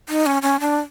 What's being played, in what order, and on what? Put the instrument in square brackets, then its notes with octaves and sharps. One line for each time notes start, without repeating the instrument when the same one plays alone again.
[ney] D#4
C#4
C#4
D4